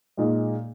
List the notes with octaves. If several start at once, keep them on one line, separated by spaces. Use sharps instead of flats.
A#2 G#3 D#4